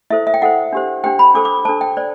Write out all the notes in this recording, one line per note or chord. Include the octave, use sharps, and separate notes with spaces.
E4 A4 C5 E5
E5
G5
E4 A4 C5 F#5
D4 G4 C5
D4 G4 C5 G5
B5
D4 A4 C5 D6
D6
D4 A4 C5 A5
G5
C5 D5